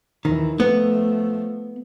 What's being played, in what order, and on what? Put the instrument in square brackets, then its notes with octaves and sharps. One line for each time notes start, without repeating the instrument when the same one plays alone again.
[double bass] D#2 E3 [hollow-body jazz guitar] D#3
[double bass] F3 A3 [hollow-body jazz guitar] B3